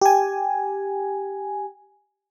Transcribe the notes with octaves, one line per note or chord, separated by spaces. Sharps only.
G4 G#5